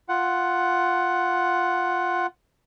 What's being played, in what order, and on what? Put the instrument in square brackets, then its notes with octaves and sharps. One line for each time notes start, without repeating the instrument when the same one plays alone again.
[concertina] F4 F#5